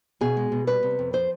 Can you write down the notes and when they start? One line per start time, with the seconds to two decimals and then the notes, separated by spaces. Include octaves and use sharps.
0.21 B2 G#4
0.37 G#3
0.52 B2
0.67 G3 B4
0.83 C3
0.99 F2
1.13 F3 C5